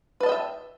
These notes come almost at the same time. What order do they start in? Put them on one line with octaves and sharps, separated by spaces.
B4 A5 D#5 G5 E5